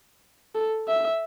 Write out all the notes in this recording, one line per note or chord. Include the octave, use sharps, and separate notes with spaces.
A4
E5